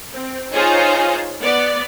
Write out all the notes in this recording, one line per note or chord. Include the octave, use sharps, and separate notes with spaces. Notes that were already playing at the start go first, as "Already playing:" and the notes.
C4
D#4 F4 G#4 C5 C#5
B3 D5